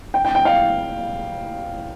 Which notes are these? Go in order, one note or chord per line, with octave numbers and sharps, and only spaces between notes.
G5
G5
G5
F5